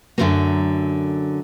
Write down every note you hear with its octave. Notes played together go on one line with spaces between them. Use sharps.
F#2 D3 F3 F#3 A3 A#3